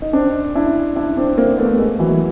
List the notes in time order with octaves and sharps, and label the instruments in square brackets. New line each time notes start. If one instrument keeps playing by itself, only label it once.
[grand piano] D#4
C4 D4
D4 E4
D4 E4
C4 D4
A#3 C4
A#3
A3 B3
B3
G#3 A#3
E3 F#3